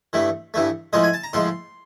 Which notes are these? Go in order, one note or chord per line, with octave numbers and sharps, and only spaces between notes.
G2 E3 A3
G2 E3 A3
A2 F3 G#3 D#5
G#5
A5
A#5
A2 F3 G#3 C6